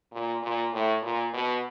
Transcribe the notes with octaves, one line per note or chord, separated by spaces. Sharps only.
A#2
A#2
A2
A#2
B2